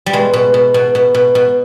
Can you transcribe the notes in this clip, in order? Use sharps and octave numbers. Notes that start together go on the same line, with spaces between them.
G3
B2 G#3
B2
B2
B2
B2
B2
B2